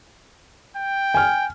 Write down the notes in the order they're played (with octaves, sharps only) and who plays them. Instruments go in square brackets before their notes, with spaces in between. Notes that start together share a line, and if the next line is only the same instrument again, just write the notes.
[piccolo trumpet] G5
[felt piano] G#5 F6